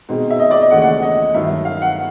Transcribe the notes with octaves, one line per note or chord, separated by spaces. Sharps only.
B2 G#3 C4 D#4
E5
D#5
D5
D#5
D#2 C#3 E3 A3 C#4 F#5
F#5
D#5
G2 D#3 F#3 E5
F5
F#5